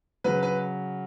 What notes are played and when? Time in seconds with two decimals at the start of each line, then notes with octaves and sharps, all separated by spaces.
0.24 C#3 F#3 B4
0.43 B4